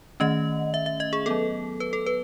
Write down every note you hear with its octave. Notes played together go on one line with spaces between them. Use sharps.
D#3 A3 C#4 D#5
E5
E5
D#5
G#4
F#3 B3 A4
B4
A4
B4